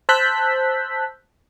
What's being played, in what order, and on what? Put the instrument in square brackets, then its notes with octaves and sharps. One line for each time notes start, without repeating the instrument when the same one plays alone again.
[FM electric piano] C5 A5 E6 F#6 G6 B6